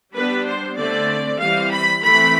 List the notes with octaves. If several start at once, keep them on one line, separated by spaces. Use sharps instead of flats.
G3 B3 D4 B4
C5
D3 A3 C4 D5
E3 G3 C4 F5
B5
E3 A3 C4 B5